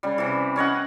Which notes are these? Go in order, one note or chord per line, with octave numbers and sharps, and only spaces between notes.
C#3 G3
C3 E3
C#4 C#5 D#5 F#5